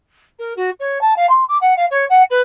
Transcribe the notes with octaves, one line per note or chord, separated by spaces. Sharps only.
A#4
F#4
C#5
A5
F5
C6
D6
F#5
F5
C#5
F#5
B4